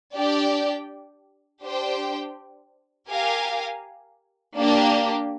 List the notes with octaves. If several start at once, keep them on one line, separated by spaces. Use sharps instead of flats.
D4 G4 D5 G5
D4 G4 C5 G5
G4 A#4 F5 G#5
A#3 D4 G4